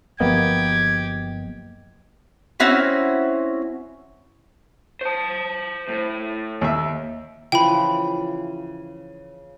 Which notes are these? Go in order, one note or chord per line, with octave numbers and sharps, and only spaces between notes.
G1 F3 F#3 A#3 B3 G4 D#5 G#6
C4 C#4 E4 F#4
C5 A5
A2
D#2 E5
C#3 E3 F3 G5 B5